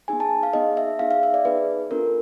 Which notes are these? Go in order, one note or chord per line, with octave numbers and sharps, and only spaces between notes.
B3 D#4 G#4 G#5
A5
F5
B3 D#4 G#4 D#5
E5
B3 D#4 G#4 F5
F5
E5
D5
B3 D#4 G#4 B4
B3 D4 F4 A4 A#4